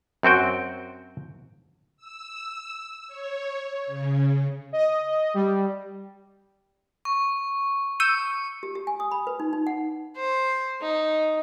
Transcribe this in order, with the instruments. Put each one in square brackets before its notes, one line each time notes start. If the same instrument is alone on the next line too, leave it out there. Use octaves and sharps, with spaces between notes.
[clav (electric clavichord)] F#2 C4 F#4 G5
[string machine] E6
C#5
C#3
[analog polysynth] D#5
G3
[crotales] C#6
[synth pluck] E6 G6 D#7 [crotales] C#7
[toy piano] G4
G4
G#5
D#6
B5
B4
D#4
D#4
F#5
[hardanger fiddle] C5
D#4